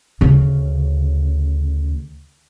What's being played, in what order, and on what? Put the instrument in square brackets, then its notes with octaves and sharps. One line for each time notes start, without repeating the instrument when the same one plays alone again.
[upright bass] D2 C#3